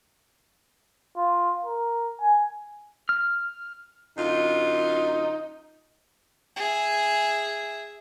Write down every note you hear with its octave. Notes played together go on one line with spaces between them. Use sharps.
F4
A#4
G#5
F6
F#2 D3 D#4 F4
G#4 E5